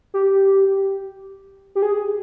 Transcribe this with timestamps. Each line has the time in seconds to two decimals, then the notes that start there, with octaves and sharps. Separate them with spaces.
0.14 G4
1.75 G4
1.82 G#4